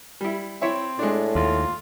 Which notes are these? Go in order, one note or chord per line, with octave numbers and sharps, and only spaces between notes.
G3 E4
C4 E4 C#5 E5
A2 G#3 D4
D#2 F4